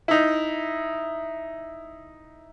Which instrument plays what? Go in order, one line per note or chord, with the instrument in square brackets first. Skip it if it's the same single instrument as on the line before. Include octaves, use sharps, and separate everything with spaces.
[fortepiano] D#4 E4